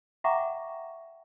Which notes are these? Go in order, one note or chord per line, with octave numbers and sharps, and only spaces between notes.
E5 F#5 G5 A#5 C#6 D6